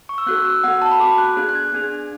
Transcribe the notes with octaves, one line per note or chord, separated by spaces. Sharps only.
C#6
E6
B3 F#4 A4 F#6
E6
B3 F#4 A4 F#5
A5
B5
B3 F#4 A4 D6
F#6
B3 D4 G#4 F#6
F#6
G#6
B3 D4 G#4